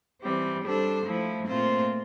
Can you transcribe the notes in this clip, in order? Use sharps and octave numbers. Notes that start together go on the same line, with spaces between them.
E3 G3 C4
G3 D4 A4 C5
F3 A3 E4
A#2 A3 C4 F4 C5